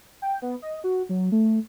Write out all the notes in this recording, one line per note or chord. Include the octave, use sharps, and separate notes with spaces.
G5
B3
D#5
F#4
F#3
A3